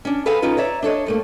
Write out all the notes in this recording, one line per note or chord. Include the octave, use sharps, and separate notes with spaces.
C#4 D4
G#4 A4 B4 F5 F#5 G#5
C#4 D#4 F4 B4
C#5 D5 E5 A#5
D4 A4 C#5 D#5
G2 A3 A#3